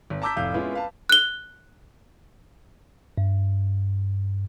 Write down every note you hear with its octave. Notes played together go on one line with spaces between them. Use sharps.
G#1
A5 A#5 D6 E6 G6 B6
F1 A2 F5 G6
G#3 B3 C#4 E4 F4
B4 F5 A5
F#6 G7
G2